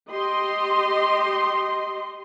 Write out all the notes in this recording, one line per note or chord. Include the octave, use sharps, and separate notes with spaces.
G4 D#5 C6